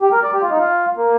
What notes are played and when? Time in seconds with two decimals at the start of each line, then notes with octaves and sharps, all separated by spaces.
0.02 G4
0.12 A#4
0.23 D5
0.33 G4
0.42 F4
0.50 D#4
0.59 F4
0.97 A#3